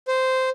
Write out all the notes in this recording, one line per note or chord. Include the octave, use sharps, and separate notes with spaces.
C5